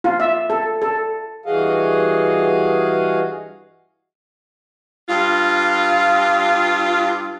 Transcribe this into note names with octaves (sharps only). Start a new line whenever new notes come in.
F4
E5
A4
A4
G2 E3 F#4 G#4 D#5 F5
G2 F4